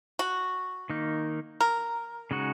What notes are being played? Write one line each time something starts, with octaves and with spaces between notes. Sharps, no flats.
F#4
D#3 A#3 D#4
A#4
C#3 G#3 D#4 F#4